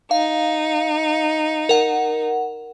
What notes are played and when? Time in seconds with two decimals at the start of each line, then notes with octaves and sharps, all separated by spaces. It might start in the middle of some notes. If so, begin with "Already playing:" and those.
0.11 D#4 F5
1.69 A#4 F#5